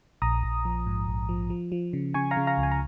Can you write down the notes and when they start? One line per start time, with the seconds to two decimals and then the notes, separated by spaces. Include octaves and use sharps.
0.22 A#1 A#5 D#6
0.44 A#1
0.65 F3
0.86 G#2
1.08 A#1
1.29 F3
1.50 F3
1.72 F3
1.93 C#3
2.14 C#3 G#5 C#6
2.31 F5 A#5
2.37 C#3
2.47 F5 A#5
2.58 C#2
2.63 G#5
2.71 A#5